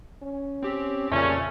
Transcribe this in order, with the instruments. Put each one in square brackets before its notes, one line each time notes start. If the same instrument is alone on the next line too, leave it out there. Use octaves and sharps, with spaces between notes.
[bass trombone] C#4
[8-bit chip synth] C4 G4
[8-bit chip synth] F2 C#3 A6 [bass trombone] A#2 [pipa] A3 [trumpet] C#4